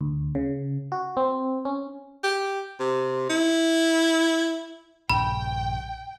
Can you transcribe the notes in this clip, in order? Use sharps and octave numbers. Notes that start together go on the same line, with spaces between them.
D2
C#3
F#4
C4
C#4
G4
C3
E4
A#1 G2 C#3 G5 B5